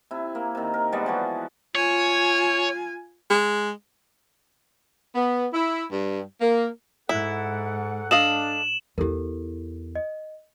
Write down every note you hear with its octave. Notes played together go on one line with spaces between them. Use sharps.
C3 E4
A#3
C3 D#3
A#4
G3 G#3 B3 D5
E3 F3 G#3 F#4
F4 C#5 G#5
G#3
B3
E4
G2
A#3
G#2 E4 A4 F#5
D4 A4 D#5 F5 E7 F#7
E2 E4 G4 A4 A#4
D#5